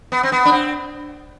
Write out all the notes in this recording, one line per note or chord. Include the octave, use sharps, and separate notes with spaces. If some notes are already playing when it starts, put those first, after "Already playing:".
B3
C4
B3
D4
C4